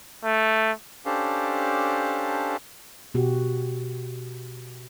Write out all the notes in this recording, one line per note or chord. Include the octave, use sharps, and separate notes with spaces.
A3
C#4 D4 G4 A4 C5 F5
B2 F#4 G4